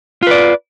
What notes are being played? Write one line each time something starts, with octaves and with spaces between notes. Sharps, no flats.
F4 B4 D5